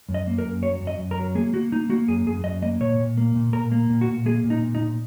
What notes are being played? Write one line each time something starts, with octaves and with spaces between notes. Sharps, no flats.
F#2
D#5
A#3
A#4
F#2
F#3 C#5
F#2
D#5
F#2
A#4
F#3
A#3 G#4
A#3 F#4
A#3 D#4
A#3 F#4
F#2 G#4
F#2 G#4
F#2 D#5
A#3 D#5
A#2 C#5
A#2
A#3
A#2
A#2 A#4
A#3
A#2
F#4
A#2
A#3 G#4
A#2
D#4
A#2
D#4
A#2